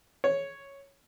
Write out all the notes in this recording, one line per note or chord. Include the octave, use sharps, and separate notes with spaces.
C#5